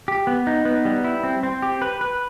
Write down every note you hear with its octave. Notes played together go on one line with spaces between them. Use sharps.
G4
B3
D#4
B3
G3
E4
C4
C4
G4
B4
B4